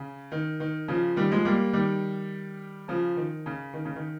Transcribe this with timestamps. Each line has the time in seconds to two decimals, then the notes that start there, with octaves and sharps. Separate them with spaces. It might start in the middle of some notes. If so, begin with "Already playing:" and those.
Already playing: C#3
0.32 D#3
0.60 D#3
0.88 C#3 F3
1.16 D#3 G3
1.30 F3 G#3
1.45 G3 A#3
1.73 D#3 G3
2.88 C#3 F3
3.17 D#3
3.46 C#3
3.74 D#3
3.85 C#3
3.96 D#3